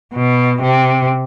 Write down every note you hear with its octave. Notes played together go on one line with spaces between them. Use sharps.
B2
C3